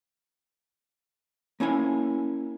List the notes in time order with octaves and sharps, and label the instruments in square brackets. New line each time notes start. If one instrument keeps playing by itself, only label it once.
[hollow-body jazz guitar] A#3 C#4 E4 G#5